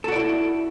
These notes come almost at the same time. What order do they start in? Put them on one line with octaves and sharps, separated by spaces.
A4 F#4 D5 E4